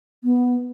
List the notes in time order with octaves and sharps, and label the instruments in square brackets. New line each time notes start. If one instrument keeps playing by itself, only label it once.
[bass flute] B3